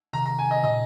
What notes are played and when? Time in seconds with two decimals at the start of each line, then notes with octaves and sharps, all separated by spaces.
0.13 C3 D#3 A#5
0.26 A#5
0.39 G#5
0.51 D#5
0.63 A#2 C#3 D#5